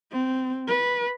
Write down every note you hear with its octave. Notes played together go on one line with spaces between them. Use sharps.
C4
B4